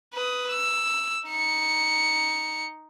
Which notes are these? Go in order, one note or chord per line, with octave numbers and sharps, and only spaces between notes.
B4 D#6
E6
D#4 C#7